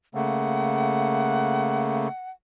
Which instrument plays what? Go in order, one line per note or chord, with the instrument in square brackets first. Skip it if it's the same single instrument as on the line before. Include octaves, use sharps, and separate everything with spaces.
[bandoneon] C#3 A3 A#3 [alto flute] F#5